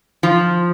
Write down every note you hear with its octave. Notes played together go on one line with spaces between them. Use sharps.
F3